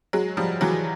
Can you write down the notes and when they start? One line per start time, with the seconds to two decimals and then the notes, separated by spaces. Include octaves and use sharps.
0.13 F#3 G#3
0.37 F3 G3
0.61 E3 F#3